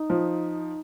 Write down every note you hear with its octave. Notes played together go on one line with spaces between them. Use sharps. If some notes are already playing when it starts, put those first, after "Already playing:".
Already playing: D#4
F3